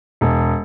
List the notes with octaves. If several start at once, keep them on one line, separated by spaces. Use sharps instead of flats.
E1